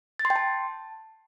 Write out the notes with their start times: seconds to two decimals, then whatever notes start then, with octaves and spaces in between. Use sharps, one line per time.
0.19 A6
0.25 C6
0.30 G5
0.36 A5